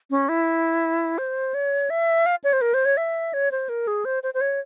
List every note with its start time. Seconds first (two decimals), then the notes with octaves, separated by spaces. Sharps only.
0.11 C#4
0.29 E4
1.18 C5
1.54 C#5
1.90 E5
2.26 F5
2.44 C#5
2.53 C5
2.61 A#4
2.74 C5
2.85 C#5
2.97 E5
3.34 C#5
3.52 C5
3.69 A#4
3.87 G#4
4.05 C5
4.23 C5
4.34 C5
4.41 C#5